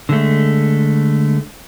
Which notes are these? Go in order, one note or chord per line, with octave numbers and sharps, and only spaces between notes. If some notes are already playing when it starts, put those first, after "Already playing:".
D3 G#3 A3